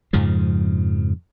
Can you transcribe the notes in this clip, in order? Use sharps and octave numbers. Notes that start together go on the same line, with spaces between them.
F2 G#2 C#3 F3